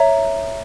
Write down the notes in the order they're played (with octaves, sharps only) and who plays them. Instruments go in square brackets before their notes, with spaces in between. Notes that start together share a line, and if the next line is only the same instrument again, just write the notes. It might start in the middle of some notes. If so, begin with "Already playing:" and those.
Already playing: [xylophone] C#5 E5 A#5